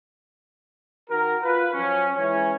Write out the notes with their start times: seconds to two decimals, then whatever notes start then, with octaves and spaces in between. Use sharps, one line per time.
1.10 D#3 F#4 A#4
1.43 F4 B4
1.74 F3 F#3 C#4
2.16 E3 G#3 C#4